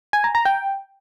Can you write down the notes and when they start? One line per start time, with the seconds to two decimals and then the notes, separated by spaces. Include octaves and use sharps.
0.13 G#5
0.24 A#5
0.35 A#5
0.45 G5